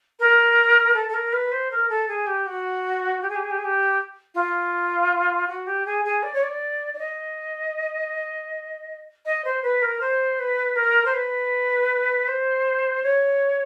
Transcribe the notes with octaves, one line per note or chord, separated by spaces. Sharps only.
A#4
A4
A4
A#4
B4
C5
A#4
A4
G#4
G4
F#4
G4
G#4
G4
G#4
G4
G#4
G4
F4
F#4
G4
G#4
G#4
D5
C#5
D5
D5
D#5
D#5
C5
B4
A#4
C5
B4
A#4
C5
B4
C5
C#5